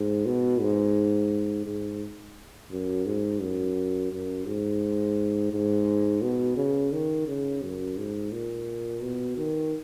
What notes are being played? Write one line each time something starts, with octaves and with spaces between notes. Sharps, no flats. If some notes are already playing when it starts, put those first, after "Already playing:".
Already playing: G#2
B2
G#2
G#2
F#2
G#2
F#2
F#2
G#2
G#2
B2
C#3
D#3
C#3
F#2
G#2
A#2
B2
D#3